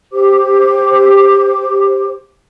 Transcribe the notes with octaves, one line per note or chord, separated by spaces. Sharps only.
G4 C5 D6